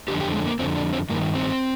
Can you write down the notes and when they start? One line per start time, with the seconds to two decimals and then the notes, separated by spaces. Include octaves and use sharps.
0.08 F2 D3 G4
0.21 G4
0.33 G#3
0.46 A#3
0.59 F2 D3 C4
0.76 D4
0.92 C4
1.10 G2 A#3
1.14 D#3
1.35 C4